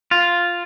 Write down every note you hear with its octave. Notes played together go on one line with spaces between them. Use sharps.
F4